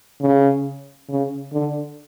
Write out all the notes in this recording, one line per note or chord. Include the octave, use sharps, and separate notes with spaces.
C#3
C#3
D3